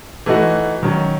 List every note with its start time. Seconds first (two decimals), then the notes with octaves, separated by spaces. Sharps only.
0.26 E3 A3 D#4 F#4
0.83 D#3 F#3 C#4